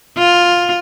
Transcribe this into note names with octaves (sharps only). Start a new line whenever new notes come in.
F4